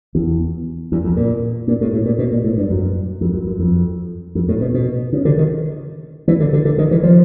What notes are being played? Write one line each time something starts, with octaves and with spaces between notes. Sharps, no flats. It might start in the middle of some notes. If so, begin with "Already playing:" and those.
E2
E2
F2
A#2
A#2
A2
A2
A#2
B2
A#2
A2
G2
F#2
F2
F#2
F#2
F2
F2
A2
B2
B2
C#3
D3
D#3
E3
D3
D3
D3
D#3
E3
F3